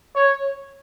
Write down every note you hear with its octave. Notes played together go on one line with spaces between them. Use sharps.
C#5